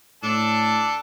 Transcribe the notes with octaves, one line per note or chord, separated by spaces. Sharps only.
A2 D4 A4 A5